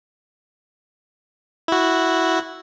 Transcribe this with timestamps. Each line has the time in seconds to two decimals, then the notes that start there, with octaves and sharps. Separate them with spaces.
1.68 E4 F#4